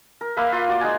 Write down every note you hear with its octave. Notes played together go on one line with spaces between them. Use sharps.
A#4
A#3 B4 E5 F5
F4 C6
F#4 D5
G#3 D#4 F#5 G#5